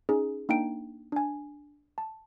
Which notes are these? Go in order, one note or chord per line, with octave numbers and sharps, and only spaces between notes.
C#4 D#4 G#4
A#3 D4 D#4 G5 D7
D4 G#5
A5